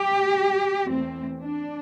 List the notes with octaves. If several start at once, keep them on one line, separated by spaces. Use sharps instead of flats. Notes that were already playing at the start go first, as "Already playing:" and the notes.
Already playing: G4
E2 E3 A3 C4
D4